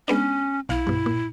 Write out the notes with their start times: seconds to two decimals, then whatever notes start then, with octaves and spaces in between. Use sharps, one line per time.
0.08 G#3 B3 C#4 D4
0.69 B1 E4 F5
0.87 G2 B2
1.06 A#2